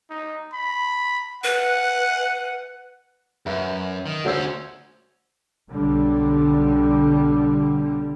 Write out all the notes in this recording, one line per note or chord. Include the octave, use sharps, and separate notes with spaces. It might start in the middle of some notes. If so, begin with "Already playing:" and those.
D#4
B5
B4 F#5
F#2 B4 E5
D#3
D2 C#4 F#4 C5 E6
B1 D3 G3